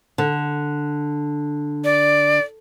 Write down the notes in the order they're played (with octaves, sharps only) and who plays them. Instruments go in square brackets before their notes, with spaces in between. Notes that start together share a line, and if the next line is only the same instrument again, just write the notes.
[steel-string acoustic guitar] D3
[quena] D5